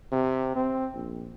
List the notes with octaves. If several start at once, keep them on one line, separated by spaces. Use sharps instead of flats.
C3
C4
A#1